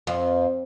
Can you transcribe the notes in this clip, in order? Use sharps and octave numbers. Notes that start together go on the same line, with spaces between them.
F2